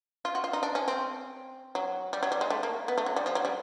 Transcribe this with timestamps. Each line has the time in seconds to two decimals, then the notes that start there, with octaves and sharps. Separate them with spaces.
0.25 F4
0.35 F#4
0.44 F4
0.53 D#4
0.63 D4
0.75 C#4
0.88 C4
1.75 F#3
2.13 G3
2.23 F#3
2.32 G3
2.41 G#3
2.50 A3
2.63 A#3
2.88 B3
2.98 A3
3.06 F#3
3.16 G3
3.26 F3
3.35 F#3
3.45 G3